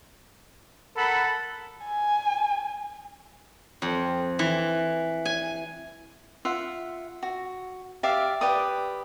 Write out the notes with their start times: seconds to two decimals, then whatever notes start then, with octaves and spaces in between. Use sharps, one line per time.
0.97 A4 A#4 F#5 B5
1.85 G#5
3.82 F2
4.39 E3
5.25 G#5
6.45 F4 E5 F#5
7.23 F#4
8.03 G4 D5 E5 F5
8.41 G4 B4 D5 D#6